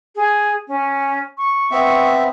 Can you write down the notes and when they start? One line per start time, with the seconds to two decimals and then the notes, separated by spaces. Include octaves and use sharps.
0.16 G#4
0.68 C#4
1.38 C#6
1.71 B3 C4 E5